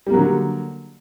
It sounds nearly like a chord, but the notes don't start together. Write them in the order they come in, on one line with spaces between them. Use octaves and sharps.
G3 A#3 F#3 D3